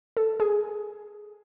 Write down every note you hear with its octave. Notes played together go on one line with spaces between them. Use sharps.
A4
G#4